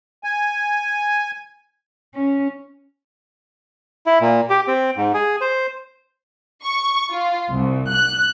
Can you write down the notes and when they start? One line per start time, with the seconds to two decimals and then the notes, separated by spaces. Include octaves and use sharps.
0.24 G#5
2.15 C#4
4.06 E4
4.21 A#2
4.50 G4
4.68 C4
4.97 G#2
5.14 G#4
5.41 C5
6.64 C#6
7.11 F4
7.52 C2
7.92 F#6